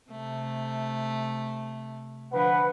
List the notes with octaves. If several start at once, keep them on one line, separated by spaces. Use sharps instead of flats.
C3 A3
D3 F3 B4 F#5